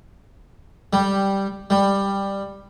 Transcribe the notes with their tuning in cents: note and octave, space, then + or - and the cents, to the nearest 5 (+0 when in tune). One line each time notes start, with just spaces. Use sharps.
G3 +0
G3 +10